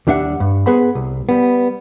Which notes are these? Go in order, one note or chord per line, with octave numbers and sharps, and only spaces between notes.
D#2 G3 D4 E5 F#5
G2
B3 G#4 B4 C5 F#5 B5
C2
G3 B3